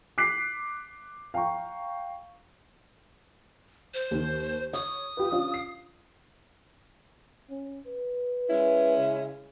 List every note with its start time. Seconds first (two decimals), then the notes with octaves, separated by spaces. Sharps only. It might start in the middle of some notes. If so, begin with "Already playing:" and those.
0.18 D6 F#6 B6 C7
1.34 F5 G5 A#5 C#6
3.94 C5
4.11 D#2 D#3
4.73 C#5 D#6
5.17 F4 G4 B4
5.32 C#4 D4 F4
5.54 C7
7.50 C#4
7.87 B4
8.48 G#3 C#4 E4
8.97 C#3